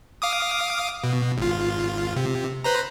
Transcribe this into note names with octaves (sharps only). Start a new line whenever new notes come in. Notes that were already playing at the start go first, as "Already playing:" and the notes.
F5 D6 D#6
B2
G#1 F4
C3
B4 C5 A#5